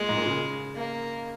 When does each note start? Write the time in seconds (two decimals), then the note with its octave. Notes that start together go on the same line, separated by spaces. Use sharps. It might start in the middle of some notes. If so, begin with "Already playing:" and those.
Already playing: A#2 G#3
0.09 G#2
0.17 A#2
0.26 C#3
0.75 A#3